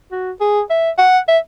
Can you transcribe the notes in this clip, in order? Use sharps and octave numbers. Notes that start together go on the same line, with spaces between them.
F#4
G#4
E5
F#5
E5